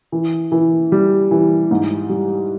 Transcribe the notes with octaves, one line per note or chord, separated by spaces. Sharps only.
E3
E3
G3
E3
G#2
G3